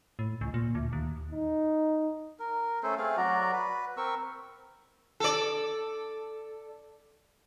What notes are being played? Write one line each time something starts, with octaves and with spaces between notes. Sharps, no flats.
A2
C#2
A#2
D2
D#2
D#4
A#4
A3 C#4 A4 C5
A3 C4 G#4 F5
F#3 F#4 D5 A#5
B4
C4 A#4 C#6 E6
A4 D5